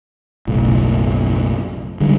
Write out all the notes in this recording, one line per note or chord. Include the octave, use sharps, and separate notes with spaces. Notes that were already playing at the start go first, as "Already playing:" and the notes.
F#1 B1 A2
D3 D#3 G3 G#3